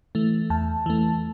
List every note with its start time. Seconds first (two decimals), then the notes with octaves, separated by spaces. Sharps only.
0.15 E3 A3
0.50 E2 A5
0.86 E3 A3